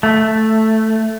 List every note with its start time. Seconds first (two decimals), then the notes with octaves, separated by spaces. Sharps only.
0.03 A3